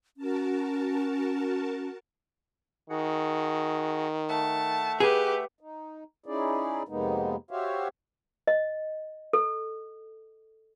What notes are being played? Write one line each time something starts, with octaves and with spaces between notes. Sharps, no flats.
C#4 F#4 A#4 A5
D#3 F#4 G#4 F#5
A3 E5 F#5 A5
G4 G#4 B4
D#4
C#4 D#4 E4 G#4 D5
F2 C3 G#3 A#3 B3 D#4
F#4 G4 C5 C#5 E5 F5
D#5
A4